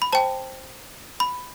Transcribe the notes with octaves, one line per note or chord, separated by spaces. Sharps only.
B5
C5 G5 A5
B5